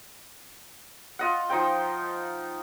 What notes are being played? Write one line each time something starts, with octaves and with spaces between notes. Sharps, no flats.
F4 D#5 F#5
F3 D#4 C5 G5